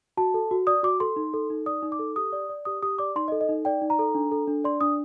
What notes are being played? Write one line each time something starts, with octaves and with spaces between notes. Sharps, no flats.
F#4 A5
A4
F#4
D5 D#6
F#4 D6
A4 C6
D#4
A4
D#4
D5 D#6
D#4
D6
A4
G4 D#6
D5
D5
G4 D#6
G4 D#6
D5 D6
D#4 C6
D#5
A4
D#5
D#4
D5 G5
D#4
A#5
A4
D4
A4
D4
D5 C6
D4 D#6